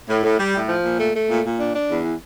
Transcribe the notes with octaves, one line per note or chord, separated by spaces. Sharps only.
A2
A2
G3
A2
F3
A#2
A3
A3
A#2
A#2
D4
D4
E2
E3